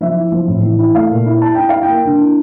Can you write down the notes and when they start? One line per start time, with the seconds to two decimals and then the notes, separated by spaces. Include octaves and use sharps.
0.01 F3 E5
0.16 E4
0.32 F3
0.47 A2
0.63 E3
0.79 E4
0.95 A3 F5
1.11 A#2
1.26 E4
1.42 E4 A5
1.55 E4 G5
1.69 E4 F5
1.83 G5
1.88 A#3
2.05 D3
2.20 E4